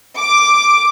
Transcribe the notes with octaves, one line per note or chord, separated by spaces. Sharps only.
D6